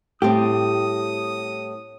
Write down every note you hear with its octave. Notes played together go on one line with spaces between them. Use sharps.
A2 G3 C4 G4 D#6